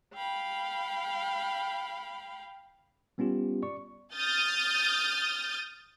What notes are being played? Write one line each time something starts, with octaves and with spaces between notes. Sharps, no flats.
F5 G5 B5
G3 B3 C#4 F4 G4
D5 C#6
D#6 F6 G6 A6